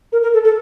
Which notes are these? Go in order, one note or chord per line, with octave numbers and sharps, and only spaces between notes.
A#4
A#4
A4
A4